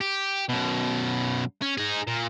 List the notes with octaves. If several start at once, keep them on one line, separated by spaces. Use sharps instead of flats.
G4
F#2 B2
C#4
D#4 G#4
A#2